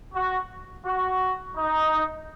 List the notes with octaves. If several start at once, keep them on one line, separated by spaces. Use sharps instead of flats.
F#4
F#4
D#4